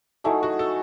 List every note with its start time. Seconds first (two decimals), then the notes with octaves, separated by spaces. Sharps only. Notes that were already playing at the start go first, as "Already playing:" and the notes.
0.24 F#3 A3 D#4 E4 G#4
0.43 F#4
0.59 A4